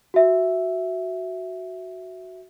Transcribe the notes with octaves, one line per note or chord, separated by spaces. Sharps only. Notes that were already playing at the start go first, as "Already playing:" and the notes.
F#4 E5